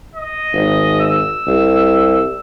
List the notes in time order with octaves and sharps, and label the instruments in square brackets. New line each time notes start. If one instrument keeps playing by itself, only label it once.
[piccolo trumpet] D#5
[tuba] G#1
[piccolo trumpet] E6
[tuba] C2